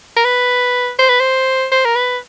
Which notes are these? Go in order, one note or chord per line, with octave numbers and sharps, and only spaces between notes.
A#4
B4
C5
B4
C5
C5
A#4
B4